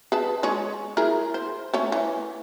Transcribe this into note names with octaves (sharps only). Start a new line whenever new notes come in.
G#4 B4 A5
G#3 G#4 C#5
E4 G#4 A#4
C5
A3 C#4 C#5
E3